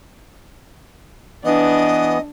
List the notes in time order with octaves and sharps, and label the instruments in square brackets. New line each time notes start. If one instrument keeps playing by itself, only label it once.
[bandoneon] E3 B3 [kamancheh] D4 [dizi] D#5